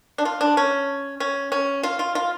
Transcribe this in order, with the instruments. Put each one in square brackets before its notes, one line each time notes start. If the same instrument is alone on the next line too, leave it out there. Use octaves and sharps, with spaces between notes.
[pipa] D4
F4
D4
C#4
C#4
C#4
F4
F4
F4